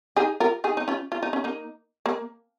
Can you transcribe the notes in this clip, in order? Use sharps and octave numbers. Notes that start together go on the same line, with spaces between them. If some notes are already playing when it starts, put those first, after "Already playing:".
D#4 G#4
F4 A#4
D#4 G#4
D#4
C#4 F4
F4
D#4
C#4
A#3 D#4
A#3